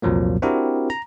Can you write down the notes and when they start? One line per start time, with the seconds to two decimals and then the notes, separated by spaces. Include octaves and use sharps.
0.02 C2 F2 A#2 F3 F#3 A#3
0.42 C4 D4 E4 F#4 G4 A#4
0.90 A#5